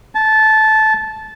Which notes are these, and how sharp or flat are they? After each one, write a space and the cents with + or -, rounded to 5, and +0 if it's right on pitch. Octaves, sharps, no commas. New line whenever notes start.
A5 -15